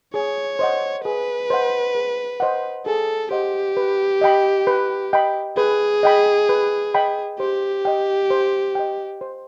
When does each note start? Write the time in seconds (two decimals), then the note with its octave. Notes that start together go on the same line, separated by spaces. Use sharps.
0.14 G#4 C#5
0.59 C5 D#5 F#5
1.05 G#4 B4
1.50 C5 D#5 F#5
1.95 G#4
2.40 C5 D#5 F#5
2.86 G#4 A4
3.31 G4 C5 D#5 F#5
3.77 B4
4.21 D#5 G5 B5
4.67 B4
5.13 D#5 G5 B5
5.57 G#4 B4
6.03 D#5 G5 B5
6.49 B4
6.94 D#5 G5 B5
7.39 G4 C5
7.85 D#5 G5
8.30 C5
8.75 D#5 G5
9.21 C5